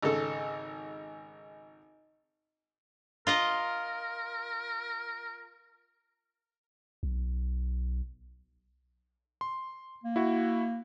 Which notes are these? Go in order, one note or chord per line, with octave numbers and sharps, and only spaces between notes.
G#1 C#3 A4
F4 A#4 D#5 A#5
B1
C6
A#3
E4 F#4